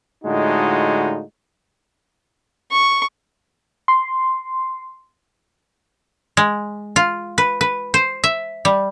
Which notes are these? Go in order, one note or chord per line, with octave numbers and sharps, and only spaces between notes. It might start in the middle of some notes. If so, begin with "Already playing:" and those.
A2 D3 G#3 D#4 F4 F#4
C#6
C6
G#3
F4
B4
B4
C5
E5
G3